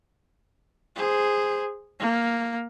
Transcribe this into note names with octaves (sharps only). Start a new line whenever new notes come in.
G#4 C5
A#3